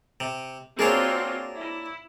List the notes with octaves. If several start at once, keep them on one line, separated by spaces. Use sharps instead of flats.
C3
A#3 C4 D4 F4 F#4 G#4 A#4 C#5
E4